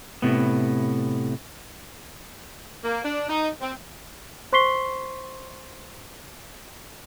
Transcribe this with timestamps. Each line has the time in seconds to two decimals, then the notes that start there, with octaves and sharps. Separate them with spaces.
0.22 A2 C3 B3
2.84 A#3
3.04 D4
3.29 D#4
3.61 C4
4.53 C5 C6 C#6 B6 C7 G7